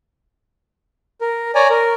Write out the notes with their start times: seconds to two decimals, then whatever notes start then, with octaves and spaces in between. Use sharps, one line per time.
1.21 A#4
1.55 C#5 D5 G#5 A#5
1.70 A#4